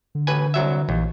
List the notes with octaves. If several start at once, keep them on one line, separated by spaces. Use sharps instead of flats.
D3
A1 B4 G#5
C2 F#3 E5
A#1 D#2 E3